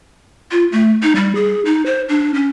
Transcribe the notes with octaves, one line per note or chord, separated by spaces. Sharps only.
F4
A3
D#4
G3
G#4
D#4
C5
D4
C#4